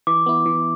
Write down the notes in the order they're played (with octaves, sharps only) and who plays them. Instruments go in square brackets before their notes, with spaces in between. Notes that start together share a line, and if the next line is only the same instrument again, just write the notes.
[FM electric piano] E3 [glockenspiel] D6
[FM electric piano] B3 E4
E3